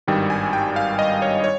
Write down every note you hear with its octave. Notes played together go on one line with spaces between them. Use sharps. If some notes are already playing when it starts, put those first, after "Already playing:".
G#1 G2 D#3 G3 G5
G#5
G5
F5
D#5
C#5
C#5